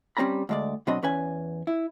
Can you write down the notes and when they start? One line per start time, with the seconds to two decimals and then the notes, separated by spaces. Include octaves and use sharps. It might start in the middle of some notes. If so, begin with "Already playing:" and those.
0.17 G3 C4 C#4 A#5 B5
0.49 D2 G#3 D5
0.87 B2 F#3 C4 D4 D#5 B5
1.03 E2 C#4 B4 G#5
1.67 E4